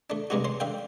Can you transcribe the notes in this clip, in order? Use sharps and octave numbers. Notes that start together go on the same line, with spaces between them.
A3 D4
G2 C3 G#3 D#4 F#4
C#4 C6
D3 E5 F5 G5